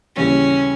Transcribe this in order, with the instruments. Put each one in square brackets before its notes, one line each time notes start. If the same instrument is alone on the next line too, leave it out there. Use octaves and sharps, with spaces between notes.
[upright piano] D#2 C#3 E3 G3 [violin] C#4